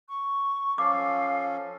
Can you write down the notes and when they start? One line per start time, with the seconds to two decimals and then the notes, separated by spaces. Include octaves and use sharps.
0.09 C#6
0.78 F3 C#4 A4 F5 D6